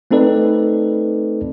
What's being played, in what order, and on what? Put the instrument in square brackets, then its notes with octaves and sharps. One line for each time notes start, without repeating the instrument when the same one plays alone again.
[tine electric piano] A3 C4 D#4 A4 B4 D5